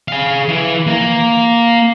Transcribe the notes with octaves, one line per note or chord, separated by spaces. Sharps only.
G#4 F5
E3
A#3